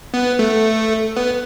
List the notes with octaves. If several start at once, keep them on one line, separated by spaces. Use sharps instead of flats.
B3
A3
B3